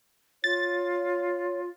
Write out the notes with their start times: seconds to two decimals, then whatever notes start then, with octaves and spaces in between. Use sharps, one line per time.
0.44 F4 C#5 A6